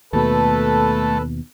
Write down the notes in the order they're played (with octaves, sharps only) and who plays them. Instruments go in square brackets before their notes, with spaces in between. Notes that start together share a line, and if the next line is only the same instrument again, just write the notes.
[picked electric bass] D#2 B2 [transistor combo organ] A3 [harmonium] A4 B4